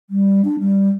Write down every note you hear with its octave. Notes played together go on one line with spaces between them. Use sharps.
G3
D4
G3